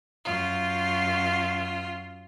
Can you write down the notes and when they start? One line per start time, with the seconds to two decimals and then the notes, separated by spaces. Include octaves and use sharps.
0.25 F#2 F4